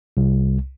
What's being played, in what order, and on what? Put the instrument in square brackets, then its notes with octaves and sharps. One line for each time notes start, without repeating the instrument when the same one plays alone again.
[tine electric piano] C2